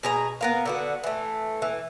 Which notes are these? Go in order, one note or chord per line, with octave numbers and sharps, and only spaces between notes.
B2 G#4 A#5
B3 A#4 F5
D3 B3 F#4
E3 A3
E3